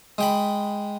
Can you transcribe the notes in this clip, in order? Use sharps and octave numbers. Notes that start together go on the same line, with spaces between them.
G#3 G5 B5